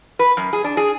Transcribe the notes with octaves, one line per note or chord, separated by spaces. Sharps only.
B4
F#2
G#4
D4
G#4